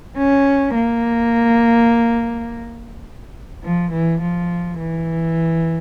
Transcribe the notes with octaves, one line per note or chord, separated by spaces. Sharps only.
C#4
A#3
F3
E3
F3
E3